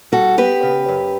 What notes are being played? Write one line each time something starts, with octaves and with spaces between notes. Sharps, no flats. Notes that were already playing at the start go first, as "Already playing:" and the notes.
G3 F#4 A4
B3 G4 B4
C#3
F#2